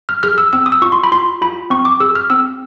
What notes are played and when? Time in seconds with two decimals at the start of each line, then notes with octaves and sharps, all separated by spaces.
0.09 F6
0.23 G#4 F6
0.38 E6
0.53 C4 E6
0.66 D#6
0.72 E6
0.82 F4 C#6
0.92 C6
1.04 B5
1.12 F4 C6
1.42 F4 B5
1.70 C4 C#6
1.85 D6
2.00 G#4 E6
2.15 F6
2.30 C4 E6